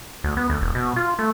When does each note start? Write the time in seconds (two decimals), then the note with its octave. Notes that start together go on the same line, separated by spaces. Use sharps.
0.24 D2
0.37 B3
0.50 D2
0.61 E1
0.75 B2
0.96 F4
1.19 A3